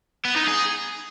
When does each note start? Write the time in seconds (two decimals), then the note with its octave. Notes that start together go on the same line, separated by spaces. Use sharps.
0.25 B3
0.36 D#4
0.48 G#4